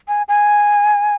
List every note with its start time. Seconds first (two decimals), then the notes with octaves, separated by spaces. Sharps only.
0.08 G#5
0.28 G#5